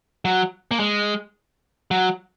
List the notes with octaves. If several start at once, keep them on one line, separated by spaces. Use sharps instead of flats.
F#3
A#3
G#3
F#3